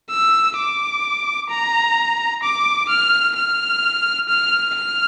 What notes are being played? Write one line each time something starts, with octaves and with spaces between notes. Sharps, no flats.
E6
D6
A#5
D6
F6
F6
F6
F6